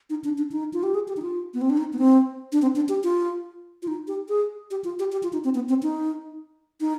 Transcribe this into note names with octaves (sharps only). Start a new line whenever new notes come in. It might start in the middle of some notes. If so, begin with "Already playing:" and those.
D#4
D4
D4
D#4
F4
G4
G#4
G4
D#4
F4
B3
C4
D4
D#4
B3
C4
D4
C4
D4
G4
F4
F4
D#4
G4
G#4
G4
F4
G4
G4
F4
D#4
C4
B3
C4
D#4
D#4